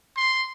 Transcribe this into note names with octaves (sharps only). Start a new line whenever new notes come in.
C6